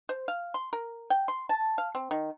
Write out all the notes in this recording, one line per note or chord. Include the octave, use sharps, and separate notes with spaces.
C5
F5
C6
A#4
G5
C6
A5
F5
C4
D#3